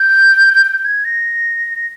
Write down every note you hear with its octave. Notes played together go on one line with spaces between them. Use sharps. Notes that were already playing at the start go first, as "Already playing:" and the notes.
Already playing: G6
G6
G#6
A#6